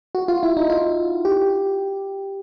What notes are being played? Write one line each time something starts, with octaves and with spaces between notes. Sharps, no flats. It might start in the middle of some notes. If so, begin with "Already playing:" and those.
F#4
F4
E4
D#4
F4
G4